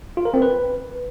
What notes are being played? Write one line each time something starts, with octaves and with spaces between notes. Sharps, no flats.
F4
A#4
C4
B4